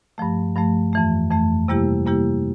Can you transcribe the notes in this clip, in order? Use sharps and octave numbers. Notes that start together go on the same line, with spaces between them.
G2 F3 A3
G2 F3 A3
F2 E3 A3
F2 E3 A3
C3 G3 A#3 E4 G4
C3 G3 A#3 E4 G4